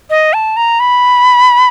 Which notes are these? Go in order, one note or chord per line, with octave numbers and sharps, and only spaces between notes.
D#5
A5
A#5
B5